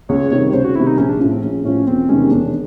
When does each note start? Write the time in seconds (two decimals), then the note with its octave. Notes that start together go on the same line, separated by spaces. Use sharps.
0.09 C#2 C#5
0.31 C3 D#3 G3 C#5
0.53 C#2 C5
0.64 F#4
0.75 C3 D#3 G3 E4
0.87 D#4
0.98 A#1 C#4
1.09 D4
1.20 A2 F3 C#4
1.32 C4
1.42 A#1 C#4
1.64 A2 F3 C#4
1.87 E1 C4
2.09 E2 C3 D#3 G#3 C#4
2.31 E1 D4